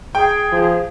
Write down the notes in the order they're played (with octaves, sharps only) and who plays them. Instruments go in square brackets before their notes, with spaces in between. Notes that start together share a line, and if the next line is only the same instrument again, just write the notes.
[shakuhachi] G#4 [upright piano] G5
[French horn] F3